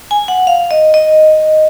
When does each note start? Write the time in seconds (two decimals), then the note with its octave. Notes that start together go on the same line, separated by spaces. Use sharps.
0.11 G#5
0.28 F#5
0.47 F5
0.71 D#5
0.94 D#5